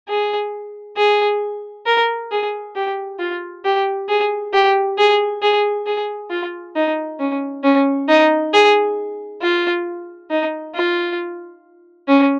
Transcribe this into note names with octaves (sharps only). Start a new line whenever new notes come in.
G#4
G#4
A#4
G#4
G4
F4
G4
G#4
G4
G#4
G#4
G#4
F4
D#4
C#4
C#4
D#4
G#4
F4
D#4
F4
C#4